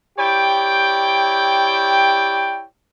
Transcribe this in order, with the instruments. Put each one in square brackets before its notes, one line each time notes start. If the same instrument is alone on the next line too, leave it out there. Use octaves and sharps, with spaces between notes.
[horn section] E4 G4 C#5 D5 G5